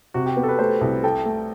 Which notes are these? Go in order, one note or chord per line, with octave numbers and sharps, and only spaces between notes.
C3 F#4
G4
B3
A4
B4
A3 C5
C2
A4 G5
A3